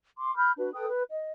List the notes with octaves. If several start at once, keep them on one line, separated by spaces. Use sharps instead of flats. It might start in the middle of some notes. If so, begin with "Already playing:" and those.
C6 D6
B5 F6 G6
D4 F#4 B4
A4 B4 G5 D#6
B4
D#5